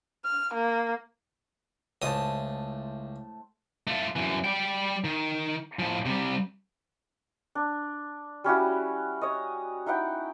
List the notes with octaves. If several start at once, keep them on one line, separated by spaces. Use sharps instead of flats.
F6
A#3
C#2 A2 C5 A5 D#6
A3 F4
F#2 E3
G3 G5
D#3
A2 F3
C3 G3
D4
G3 C#4 E4 F#4
C#5 D#5
D#4 E4 F#5 G5